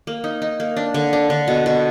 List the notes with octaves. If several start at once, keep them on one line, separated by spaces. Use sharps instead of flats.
A#3
D#4
D#4
A#3
D4
D3
D4
D3
B2
B2